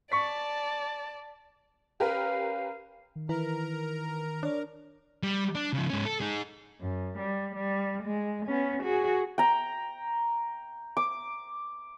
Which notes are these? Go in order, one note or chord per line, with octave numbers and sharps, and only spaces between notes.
D5 A5 C#6 B6
C#4 G4 A#4 B4 F5
D#3
E3 E4 A#4 B4 A#5
D4 C#5 D5
G3
D4
C#3 F3
G#2 C#4
A4
D#4 G#4
F#2
G3
G3
G#3
B3 C#4
F#4 G#4
G5 A#5
D6